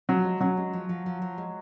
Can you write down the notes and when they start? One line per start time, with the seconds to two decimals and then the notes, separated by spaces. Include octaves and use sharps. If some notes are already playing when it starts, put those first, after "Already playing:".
0.09 F3 F#3
0.24 G#3
0.41 F#3 C#4
0.57 G#3
0.73 F3
0.89 F3
1.06 F3
1.22 F3
1.38 G#3